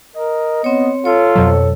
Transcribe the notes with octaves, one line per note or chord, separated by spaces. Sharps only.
A#4 D#5
B3 C4 C#5
F4 A4 C#5
F2 B2 F#3